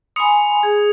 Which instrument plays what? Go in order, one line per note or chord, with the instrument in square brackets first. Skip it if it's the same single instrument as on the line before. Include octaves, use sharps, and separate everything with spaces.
[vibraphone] G#5 B5 C6 [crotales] D#6 C#7
[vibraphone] G#4